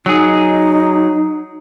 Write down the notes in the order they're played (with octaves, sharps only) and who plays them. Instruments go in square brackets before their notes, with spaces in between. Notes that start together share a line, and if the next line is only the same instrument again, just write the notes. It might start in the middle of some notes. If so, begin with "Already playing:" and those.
[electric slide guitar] F#3 G#4 [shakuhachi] D#4